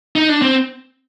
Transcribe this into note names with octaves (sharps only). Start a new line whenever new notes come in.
D#4
D4
C4